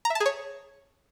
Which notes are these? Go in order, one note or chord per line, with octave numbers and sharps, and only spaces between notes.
A#5
E5
A5
G#4
C#5